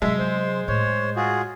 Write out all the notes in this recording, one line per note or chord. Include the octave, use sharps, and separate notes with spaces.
C3 F#3 G#3 E5
C5
A2 C5 C#5
F4 F#4 G#4